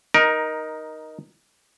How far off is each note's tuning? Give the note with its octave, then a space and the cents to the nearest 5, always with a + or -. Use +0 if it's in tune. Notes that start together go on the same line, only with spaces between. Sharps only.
D#4 +0 A#4 +15